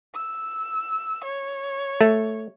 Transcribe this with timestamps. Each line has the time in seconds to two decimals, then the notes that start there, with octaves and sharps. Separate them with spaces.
0.15 E6
1.24 C#5
2.01 A3